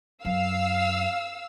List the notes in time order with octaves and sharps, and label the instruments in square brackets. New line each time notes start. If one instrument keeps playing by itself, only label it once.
[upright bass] F#2 [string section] F5 E6